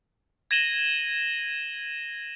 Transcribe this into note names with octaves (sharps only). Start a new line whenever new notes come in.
G#6 A#6 D#7 E7 F#7 G7